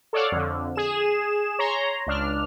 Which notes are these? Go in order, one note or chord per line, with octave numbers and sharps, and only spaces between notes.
A4 C#5 D5 F5 F#5
F2 D3
G#4 E7
C#5 A#5 C6
C#2 D4 F6